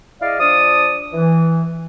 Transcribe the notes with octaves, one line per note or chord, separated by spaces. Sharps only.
E4 G#4 D5 D#5 F5
F3 D4 D5 D#6
E3